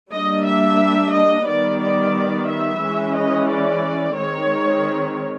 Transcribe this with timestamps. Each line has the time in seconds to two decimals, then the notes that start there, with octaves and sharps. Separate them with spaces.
0.11 G3 A#3 D4 D#5
0.45 E5
1.12 D#5
1.46 D#3 G3 B3 D5
1.80 D5
2.48 E5
2.82 E3 G#3 C#4
3.15 D#5
3.49 D5
4.16 D#3 G#3 C4 C#5